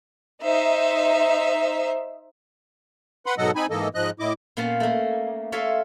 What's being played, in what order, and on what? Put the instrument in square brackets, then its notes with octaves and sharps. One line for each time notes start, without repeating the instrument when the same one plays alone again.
[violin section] D#4 C5 E5
[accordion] B4 F#5 B5 C6
G#2 B2 F#3 A4 D#5 F#5
C4 D#4 G#5 B5
G#2 E3 A#3 A4 D#5
G#2 F3 D#5 F#6
A2 E4 D#5 D6
[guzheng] A#2 A#3 B3 C#4 F5 A5
A3 A#3
F4 A4 C#5 E5 F5